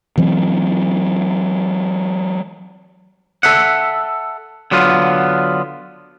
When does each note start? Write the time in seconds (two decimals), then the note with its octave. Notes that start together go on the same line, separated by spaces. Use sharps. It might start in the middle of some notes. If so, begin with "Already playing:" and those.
0.18 E3 F#3 C4
3.43 A4 E5 F#5
4.71 D3 F#3 B3 F4